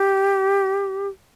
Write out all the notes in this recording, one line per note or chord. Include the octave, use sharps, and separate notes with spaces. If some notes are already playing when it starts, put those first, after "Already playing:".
Already playing: G4